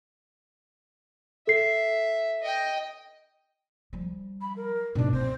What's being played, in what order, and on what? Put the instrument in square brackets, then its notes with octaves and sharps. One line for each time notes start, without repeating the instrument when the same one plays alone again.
[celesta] A4 C7 [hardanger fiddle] E5
[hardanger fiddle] D#5 G5
[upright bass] F3 G3
[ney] B5
A#4
[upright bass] G#2 B2 [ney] D4
[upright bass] C4 [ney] C5